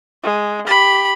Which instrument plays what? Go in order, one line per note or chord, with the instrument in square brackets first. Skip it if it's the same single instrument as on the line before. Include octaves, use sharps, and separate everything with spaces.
[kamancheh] G#3
G4 B5